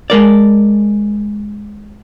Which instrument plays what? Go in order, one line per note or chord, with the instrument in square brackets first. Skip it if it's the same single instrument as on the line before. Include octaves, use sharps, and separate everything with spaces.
[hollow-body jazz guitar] G#3 A#4 D5